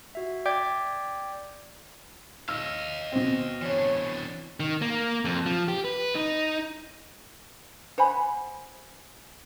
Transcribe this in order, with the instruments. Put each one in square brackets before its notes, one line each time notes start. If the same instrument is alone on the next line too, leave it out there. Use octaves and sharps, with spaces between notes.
[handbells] F#4 E5
D5 G5 D6 G6 G#6 B6
[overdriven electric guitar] D#5 F5 [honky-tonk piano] E6
[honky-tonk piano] B2 C4
[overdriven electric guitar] E3 D4 [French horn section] C#5
[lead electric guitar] D#3
A#3
F2
F3
G4
B4
D#4
[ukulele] C5 F#5 G#5 B5